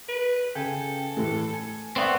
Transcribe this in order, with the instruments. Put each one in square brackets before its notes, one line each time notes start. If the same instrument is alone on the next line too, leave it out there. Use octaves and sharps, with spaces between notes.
[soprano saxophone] B4
[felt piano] C#3 [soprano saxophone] A4 [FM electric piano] G5 G#5
[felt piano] A2 E3 [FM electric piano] A3
[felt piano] G#5
[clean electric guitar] B3 C4 [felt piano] A#4 D5 E5 [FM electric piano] C#6